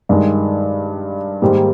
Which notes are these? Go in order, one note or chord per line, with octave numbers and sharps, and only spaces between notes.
G2 D#3 G#3
G#2 D#3 G3 A#3